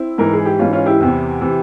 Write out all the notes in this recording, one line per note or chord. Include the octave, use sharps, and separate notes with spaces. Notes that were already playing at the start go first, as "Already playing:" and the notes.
Already playing: C4 E4
G#2 E3 A#4
G#4
G4
G#2 E3 C#4 F4
C#4 F4
E4 G4
E2 C3 E3
C3 E3